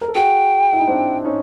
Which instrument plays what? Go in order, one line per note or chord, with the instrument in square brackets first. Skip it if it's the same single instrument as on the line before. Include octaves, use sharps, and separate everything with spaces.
[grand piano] A#4
A4
[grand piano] F#4 G#4 [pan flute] G5
[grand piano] E4
D#4
C4 D4
C#4 D#4